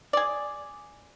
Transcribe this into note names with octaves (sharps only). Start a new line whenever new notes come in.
G#4 D5